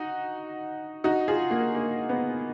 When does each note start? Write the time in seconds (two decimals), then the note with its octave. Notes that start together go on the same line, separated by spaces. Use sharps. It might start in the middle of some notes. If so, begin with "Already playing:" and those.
Already playing: D#4 F#4
1.04 D#4 F#4
1.28 F4 G#4
1.51 A#3
1.75 A#3
2.09 B3